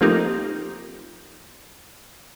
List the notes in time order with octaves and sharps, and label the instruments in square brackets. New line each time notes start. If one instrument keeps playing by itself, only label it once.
[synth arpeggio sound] F3 A3 A#3 C4 D#4 G4